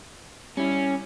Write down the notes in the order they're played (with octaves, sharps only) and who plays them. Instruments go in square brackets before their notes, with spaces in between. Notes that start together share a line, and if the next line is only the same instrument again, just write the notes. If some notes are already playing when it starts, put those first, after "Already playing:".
[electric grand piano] G3 E4 [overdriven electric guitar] C#4